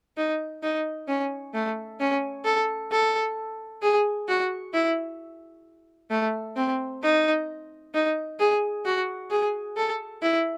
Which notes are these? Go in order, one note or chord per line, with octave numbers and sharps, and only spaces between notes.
D#4
D#4
C#4
A3
C#4
A4
A4
G#4
F#4
E4
A3
C4
D#4
D#4
G#4
F#4
G#4
A4
E4